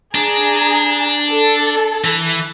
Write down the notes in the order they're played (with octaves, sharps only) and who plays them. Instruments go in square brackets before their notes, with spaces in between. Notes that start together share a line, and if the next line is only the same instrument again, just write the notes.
[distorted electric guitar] D4 [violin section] G#4 A#5
[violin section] A4
[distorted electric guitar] E3